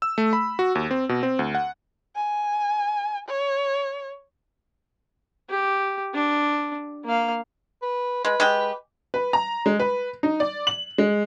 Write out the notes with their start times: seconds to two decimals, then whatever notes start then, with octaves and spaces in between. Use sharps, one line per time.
0.02 E6
0.18 A3
0.33 B5
0.59 F#4
0.75 D#2
0.91 C4
1.09 B2
1.23 C4
1.39 D2
1.55 F#5
2.16 G#5
3.29 C#5
5.50 G4
6.14 D4
7.05 A#3 F5
7.82 B4
8.25 G#3 B4
8.40 G#3 G4
9.14 B4
9.33 A#5
9.66 G#3
9.80 B4
10.23 D#4
10.40 D5
10.67 F#7
10.98 G#3